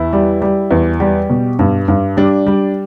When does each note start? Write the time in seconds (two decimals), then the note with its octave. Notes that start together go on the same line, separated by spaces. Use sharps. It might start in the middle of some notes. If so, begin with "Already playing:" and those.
Already playing: E2 E4
0.13 G3
0.42 G3
0.71 E2
1.00 G3 G4
1.30 B2
1.59 G2
1.88 G2
2.17 G3 D4
2.46 G3